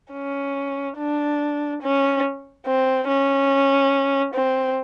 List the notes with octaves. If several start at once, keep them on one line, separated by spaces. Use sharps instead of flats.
C#4
D4
C#4
C4
C#4
C4